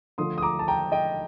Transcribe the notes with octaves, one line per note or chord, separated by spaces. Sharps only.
D3 F3 A3 D4 C6 D#6
D#6
A#5 D6
A5
G5 A#5
D#5 G5